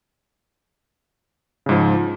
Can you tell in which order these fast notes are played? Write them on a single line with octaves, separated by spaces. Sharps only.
C#3 G#2 F3